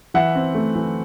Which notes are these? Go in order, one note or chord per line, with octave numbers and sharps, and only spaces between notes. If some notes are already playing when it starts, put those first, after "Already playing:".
E3 E5 F#5
C4
A3
E3